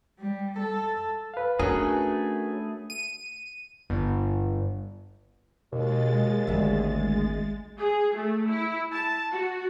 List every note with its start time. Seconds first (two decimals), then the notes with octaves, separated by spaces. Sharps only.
0.19 G3
0.59 A4
1.34 B4 F5
1.59 A3 C#4 D4 F#4 G#4 A#4 B4
2.90 D#7
3.89 G1
5.73 D#2 B2 G#3 A6
6.47 G#1 D2 E5
7.78 G#4
8.15 A3
8.49 E4
8.92 A5
9.32 F#4